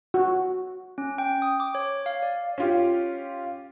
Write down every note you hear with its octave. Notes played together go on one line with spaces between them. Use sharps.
F#4
C#4
G5
D#6
D6
C#5
F5
D5
C#4 F4 G4